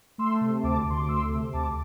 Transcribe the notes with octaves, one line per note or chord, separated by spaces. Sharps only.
A3 C6 E6
C3
D2 A5 D6
D2 C6
D6
A3 C6 E6
C3
D2 A5 D6